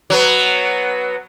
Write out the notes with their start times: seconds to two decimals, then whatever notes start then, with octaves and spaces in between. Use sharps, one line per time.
0.10 F#3 B3